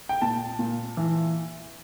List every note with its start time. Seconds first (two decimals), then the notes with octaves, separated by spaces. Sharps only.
0.09 G5
0.22 A#2 A5
0.59 A#2
0.97 E3